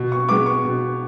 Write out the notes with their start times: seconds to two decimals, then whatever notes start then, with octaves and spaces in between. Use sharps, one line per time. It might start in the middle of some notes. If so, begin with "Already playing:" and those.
Already playing: B2
0.12 C#6
0.29 G#3 B3 D6
0.46 C#6
0.64 B2